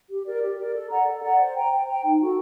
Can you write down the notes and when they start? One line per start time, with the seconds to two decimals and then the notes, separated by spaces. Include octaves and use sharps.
0.09 G4
0.25 A#4 D5
0.41 G4
0.57 A#4 D5
0.73 A4
0.89 D5 F#5 A#5
1.06 A4
1.22 D5 F#5 A#5
1.39 C5
1.55 G5 A#5
1.70 C5
1.87 G5 A#5
2.03 D#4
2.20 F#4 A4